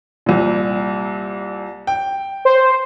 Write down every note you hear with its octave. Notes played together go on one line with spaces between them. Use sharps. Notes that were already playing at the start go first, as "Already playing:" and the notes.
C2 A#2
G5
C5